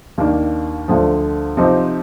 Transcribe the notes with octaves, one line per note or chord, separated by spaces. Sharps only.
D#2 D#3 A#3 D4
D2 D3 F3
C3 F3 C4 D#4